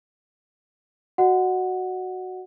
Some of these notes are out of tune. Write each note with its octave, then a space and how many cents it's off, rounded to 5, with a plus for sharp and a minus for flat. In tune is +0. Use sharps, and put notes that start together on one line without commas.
F#4 +0 D#5 -40 F#5 +0